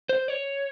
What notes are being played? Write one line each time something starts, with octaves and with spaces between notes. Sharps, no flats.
C5
C#5